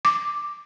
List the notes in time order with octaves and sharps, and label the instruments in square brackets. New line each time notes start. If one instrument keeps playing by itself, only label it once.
[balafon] D6